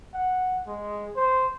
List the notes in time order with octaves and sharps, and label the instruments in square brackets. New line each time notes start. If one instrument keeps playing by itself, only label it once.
[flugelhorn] F#5
G#3
C5